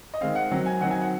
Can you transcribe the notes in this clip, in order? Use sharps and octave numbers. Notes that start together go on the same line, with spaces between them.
D#5
D#3 G#3 C4 F5
F#5
D#3 F#3 C4
G#5
D#3 F#3 C4 F#5
G#5
F#5